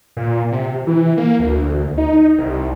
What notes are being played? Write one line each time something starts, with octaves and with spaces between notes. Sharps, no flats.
A#2
C3
E3
A#3
D2
D#4
C2